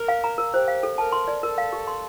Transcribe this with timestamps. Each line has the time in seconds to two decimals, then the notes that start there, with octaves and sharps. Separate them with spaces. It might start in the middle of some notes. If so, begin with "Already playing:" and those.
Already playing: A#4
0.08 F5
0.24 A#5
0.38 A#4
0.53 G4 C5
0.68 F5
0.83 A4
0.98 A#4 A5
1.12 C6
1.28 D5
1.43 A4 A#4
1.58 F5
1.73 G4
1.87 C6